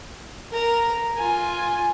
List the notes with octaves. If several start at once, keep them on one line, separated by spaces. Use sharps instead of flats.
A#4 A#5
F4 G#5